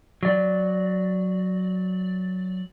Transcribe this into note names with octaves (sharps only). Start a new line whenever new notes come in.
F#3 D5